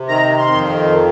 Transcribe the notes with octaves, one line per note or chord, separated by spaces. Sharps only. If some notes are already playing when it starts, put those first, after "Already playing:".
Already playing: C3
D#3 A#5
C6
F2